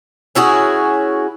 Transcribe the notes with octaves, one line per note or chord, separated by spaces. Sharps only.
C#4 E4 F#4 G#4